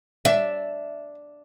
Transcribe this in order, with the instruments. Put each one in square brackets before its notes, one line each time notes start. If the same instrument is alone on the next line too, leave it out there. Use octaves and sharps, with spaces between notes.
[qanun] D4 [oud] E5